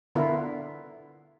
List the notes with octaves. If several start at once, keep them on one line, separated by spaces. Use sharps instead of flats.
D3 B3 E4 F4 A#4